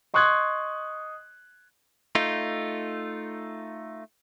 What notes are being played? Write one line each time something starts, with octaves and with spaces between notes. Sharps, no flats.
D#5 C6 C#6 D#6 F#6 G#6
A3 D#4 F4